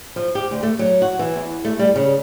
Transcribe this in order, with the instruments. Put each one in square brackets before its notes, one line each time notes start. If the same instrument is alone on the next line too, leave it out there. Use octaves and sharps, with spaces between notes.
[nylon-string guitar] F3
G4
D2
A3
F#3
F#4
E3
E2
A3
G3
C#3